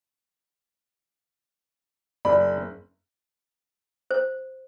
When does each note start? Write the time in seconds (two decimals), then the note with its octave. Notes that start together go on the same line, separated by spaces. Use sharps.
2.25 F#1 D5 B5
4.11 C5